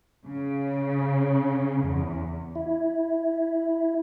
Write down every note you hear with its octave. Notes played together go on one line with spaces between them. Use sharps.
C#3
E2
E4